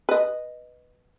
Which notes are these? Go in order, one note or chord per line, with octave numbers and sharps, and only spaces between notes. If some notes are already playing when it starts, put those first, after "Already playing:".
B4 D#5